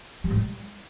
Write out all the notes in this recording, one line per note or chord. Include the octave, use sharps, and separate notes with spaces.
G3
A2
G3